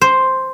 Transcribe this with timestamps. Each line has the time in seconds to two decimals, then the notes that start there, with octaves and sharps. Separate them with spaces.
0.01 C5